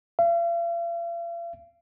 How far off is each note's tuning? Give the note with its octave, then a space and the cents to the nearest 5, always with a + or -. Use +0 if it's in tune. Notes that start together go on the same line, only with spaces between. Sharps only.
F5 -45